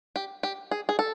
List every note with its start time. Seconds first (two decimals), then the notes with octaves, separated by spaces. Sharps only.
0.16 G4
0.43 G4
0.71 G#4
0.89 G#4
0.99 A4